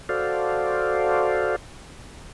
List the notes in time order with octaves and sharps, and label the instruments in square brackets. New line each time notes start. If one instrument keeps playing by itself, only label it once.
[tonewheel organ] F#4 A4 C5 D5 F5